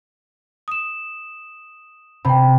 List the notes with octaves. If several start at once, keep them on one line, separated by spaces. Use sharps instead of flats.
D#6 E7
C3 G5 B5